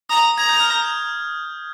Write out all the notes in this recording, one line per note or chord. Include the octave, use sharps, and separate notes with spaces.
A#5 D#6
A#5 G#6
G6
F6
G6